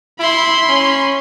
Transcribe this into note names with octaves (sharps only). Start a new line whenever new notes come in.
E4 B5 C6
C#4